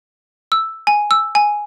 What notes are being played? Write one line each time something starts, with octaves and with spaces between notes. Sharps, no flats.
E6
G#5
E6
G#5